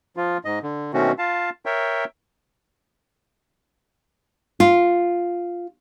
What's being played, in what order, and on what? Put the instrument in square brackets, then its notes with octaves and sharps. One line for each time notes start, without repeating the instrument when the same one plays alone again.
[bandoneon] F3 F4
G#2 D#5
D3
B2 D#3 A3 C4 C#4 F#4
F4 F5 A5
A#4 C#5 E5 G5
[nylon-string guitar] F4